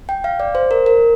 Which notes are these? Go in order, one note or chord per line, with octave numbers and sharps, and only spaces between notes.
G5
F5
D5
C5
A#4
A#4